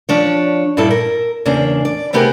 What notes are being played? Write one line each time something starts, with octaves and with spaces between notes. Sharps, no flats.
F3 D4 C#5
G2 A#2 G3 E4 A4
A#4
E2 C#3 A#3 D4
D5
C3 A3 B3 G4 G#4 A#4